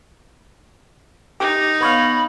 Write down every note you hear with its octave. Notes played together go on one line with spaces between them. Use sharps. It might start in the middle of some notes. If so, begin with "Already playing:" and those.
D#4 G4
B3 C#5 F5 B5